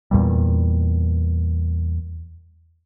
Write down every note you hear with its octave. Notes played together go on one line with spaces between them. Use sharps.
E2 A#2 G3